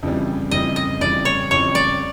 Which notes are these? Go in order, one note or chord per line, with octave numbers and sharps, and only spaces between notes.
F2 C#3 E3 G3
F2 C#3 E3 G3 D#5
D#5
F2 C#3 E3 G3 D5
C#5
F2 C#3 E3 G3 C#5
D5